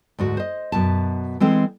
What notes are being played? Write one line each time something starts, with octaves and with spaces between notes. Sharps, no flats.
D2 G#2 F#4
C5 D#5
F#2 B2 A5
E3 G#3 C4 A4